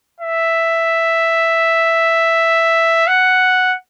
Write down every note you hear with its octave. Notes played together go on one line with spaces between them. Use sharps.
E5
F#5